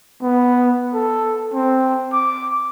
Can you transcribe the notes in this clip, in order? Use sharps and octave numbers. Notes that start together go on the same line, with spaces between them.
B3
A4
C4
D6